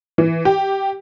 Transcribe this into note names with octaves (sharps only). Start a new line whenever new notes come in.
E3
G4